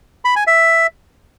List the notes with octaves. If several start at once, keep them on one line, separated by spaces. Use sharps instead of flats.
B5
G#5
E5